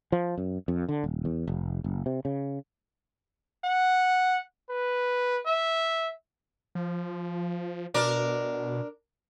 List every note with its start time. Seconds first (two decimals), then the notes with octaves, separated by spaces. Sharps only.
0.12 F3
0.38 F#2
0.68 F2
0.89 D3
1.04 D#1
1.25 E2
1.47 F1
1.84 F#1
2.06 C3
2.25 C#3
3.65 F#5
4.70 B4
5.46 E5
6.75 F3
7.94 B2 D4 A#4 D5